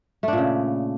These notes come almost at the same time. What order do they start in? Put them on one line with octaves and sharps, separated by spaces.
A3 D4 A#2 C#3